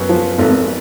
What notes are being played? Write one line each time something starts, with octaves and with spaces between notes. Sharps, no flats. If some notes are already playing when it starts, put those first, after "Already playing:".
Already playing: F#2 B3
F3
G#1